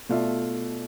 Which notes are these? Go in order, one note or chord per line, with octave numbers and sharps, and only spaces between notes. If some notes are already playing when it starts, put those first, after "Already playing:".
B2 A3 F4 D5 E5